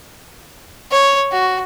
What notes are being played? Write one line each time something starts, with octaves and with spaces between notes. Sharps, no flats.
C#5
F#4